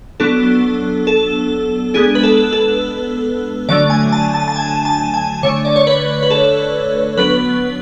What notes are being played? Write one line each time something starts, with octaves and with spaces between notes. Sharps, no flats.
F#3 B3 D4 A4
A4
G#3 B3 D4 G#4
B4
A4
A4
D3 F#3 A3 D4 D5
G#5
A5
A5
A5
G#5
A5
G#5
D3 A3 D4 C#5
D5
C#5
B4
B4
A4
F#3 B3 D4 B4